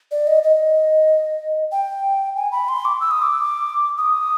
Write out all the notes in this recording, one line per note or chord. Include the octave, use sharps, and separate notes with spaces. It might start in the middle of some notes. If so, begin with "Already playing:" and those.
D5
D#5
D#5
G5
G#5
B5
C6
D6
E6
D#6
D6
D#6